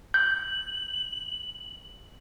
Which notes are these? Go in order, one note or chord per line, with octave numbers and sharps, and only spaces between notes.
G6 F#7